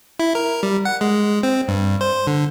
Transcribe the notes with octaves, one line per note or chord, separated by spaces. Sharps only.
E4
A#4
G3
F#5
G#3
C4
G2
C5
D3